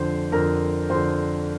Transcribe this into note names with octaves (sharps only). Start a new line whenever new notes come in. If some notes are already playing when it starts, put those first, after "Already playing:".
Already playing: F2 D3 C5 C6
F2 D3 A#4 A#5
F2 D3 C5 C6